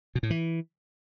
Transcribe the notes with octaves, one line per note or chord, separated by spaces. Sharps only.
B2
A2
E3